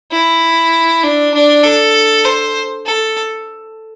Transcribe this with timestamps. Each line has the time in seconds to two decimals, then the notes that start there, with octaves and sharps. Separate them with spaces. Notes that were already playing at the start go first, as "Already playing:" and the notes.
0.12 E4
1.03 D4
1.34 D4
1.64 A4
2.25 C5
2.87 A4